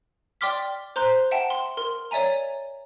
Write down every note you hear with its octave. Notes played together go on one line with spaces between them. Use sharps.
D5 G5 C6 D6 F6 B6
C5 A#5 C6 F#6 G6
E5 F#5 G5 A5
C6
A#4 C6
C#5 D5 E5 G#5 A#5